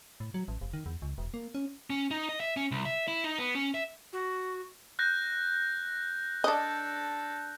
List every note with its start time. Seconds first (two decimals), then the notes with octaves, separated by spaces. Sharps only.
0.20 A2
0.34 F#3
0.48 A1
0.61 F1
0.73 D#3
0.86 E2
1.02 C#2
1.18 E1
1.34 A#3
1.55 C#4
1.90 C#4
2.11 D#4
2.29 D#5
2.40 E5
2.57 C#4
2.71 C2
2.85 E5
3.08 E4
3.24 D#4
3.39 B3
3.55 C#4
3.74 E5
4.13 F#4
4.99 F#6 G6 A#6
6.44 D4 A4 D5 D#5